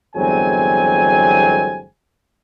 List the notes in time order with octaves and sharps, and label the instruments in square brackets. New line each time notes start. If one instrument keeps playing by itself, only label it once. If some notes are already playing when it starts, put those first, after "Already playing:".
[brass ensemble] G1 E2 F#3 G#3 C4 G#5